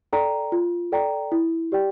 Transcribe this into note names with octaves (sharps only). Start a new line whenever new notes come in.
A4 D5 G5 A#5
F4
A4 D5 G5 A#5
E4
G4 D5 G5